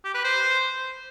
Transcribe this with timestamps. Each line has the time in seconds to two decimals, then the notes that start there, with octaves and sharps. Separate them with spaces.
0.05 G4
0.14 B4
0.24 C5